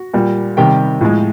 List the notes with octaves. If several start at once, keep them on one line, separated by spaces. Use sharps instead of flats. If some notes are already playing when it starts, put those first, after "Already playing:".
Already playing: F#4
A#2 G3
C3 D#3 G3 G4 G5
A2 F3 G#3